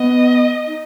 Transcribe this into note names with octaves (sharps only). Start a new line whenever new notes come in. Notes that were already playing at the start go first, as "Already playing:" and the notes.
Already playing: B3 D#5
D#4